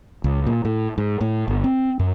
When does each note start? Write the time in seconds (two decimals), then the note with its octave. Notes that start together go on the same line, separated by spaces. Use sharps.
0.24 C#2
0.46 A#2
0.65 A2
0.98 G#2
1.21 A2
1.48 G1
1.64 C4
1.99 F#2